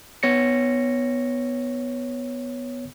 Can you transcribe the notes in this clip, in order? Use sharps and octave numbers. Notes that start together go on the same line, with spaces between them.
B3 C#5 A#6 C#7